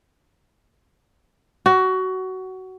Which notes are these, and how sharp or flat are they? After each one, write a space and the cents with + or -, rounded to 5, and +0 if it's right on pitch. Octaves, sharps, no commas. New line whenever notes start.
F#4 +20